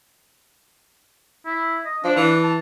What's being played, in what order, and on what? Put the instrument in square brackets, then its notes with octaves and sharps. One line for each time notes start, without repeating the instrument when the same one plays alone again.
[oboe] E4
D#5
[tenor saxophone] F3 [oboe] D4
[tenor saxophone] E3
[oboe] A5